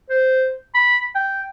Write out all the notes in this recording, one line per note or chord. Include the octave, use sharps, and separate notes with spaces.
C5
B5
G5